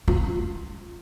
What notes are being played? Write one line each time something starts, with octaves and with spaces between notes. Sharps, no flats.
F4